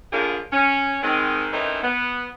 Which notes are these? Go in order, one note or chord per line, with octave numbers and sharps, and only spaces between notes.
A2 D3 F#3 A#3 F4 G#4
C#4
D#3 G#3 C4
D#3 E3 A3 C4 C#4 D#4
B3